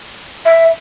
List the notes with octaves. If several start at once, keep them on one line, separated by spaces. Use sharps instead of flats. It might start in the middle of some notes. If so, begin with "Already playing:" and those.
E5